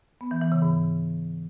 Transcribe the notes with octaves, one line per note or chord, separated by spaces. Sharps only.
B3
E3
E3
C#3
G#2